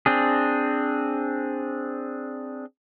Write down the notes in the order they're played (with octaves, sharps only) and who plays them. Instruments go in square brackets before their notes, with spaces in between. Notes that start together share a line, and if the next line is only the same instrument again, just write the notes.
[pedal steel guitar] C4 D4 G#4